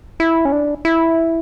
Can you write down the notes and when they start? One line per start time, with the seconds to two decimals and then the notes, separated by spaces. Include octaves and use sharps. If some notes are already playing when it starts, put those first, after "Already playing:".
0.20 E4
0.45 C#4
0.52 D4
0.85 E4